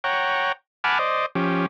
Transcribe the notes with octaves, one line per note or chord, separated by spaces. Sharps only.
C#5 F#5 G5 A#5
F#5 G#5 A5 B5 D6 F6
C5 D5 D#5
F3 C#4 G4